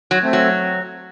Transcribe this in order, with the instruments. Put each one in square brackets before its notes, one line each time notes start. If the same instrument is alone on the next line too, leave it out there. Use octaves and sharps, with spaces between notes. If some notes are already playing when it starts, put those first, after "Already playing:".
[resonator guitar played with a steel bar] F#3
[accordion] A3 C4
[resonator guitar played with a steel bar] F#3